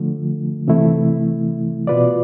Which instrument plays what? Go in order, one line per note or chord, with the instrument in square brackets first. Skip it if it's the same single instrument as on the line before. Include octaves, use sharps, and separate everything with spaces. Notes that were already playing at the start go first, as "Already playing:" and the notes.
Already playing: [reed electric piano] D3 F3 A3
C3 E3 A3 E4
B2 B3 F4 B4 D5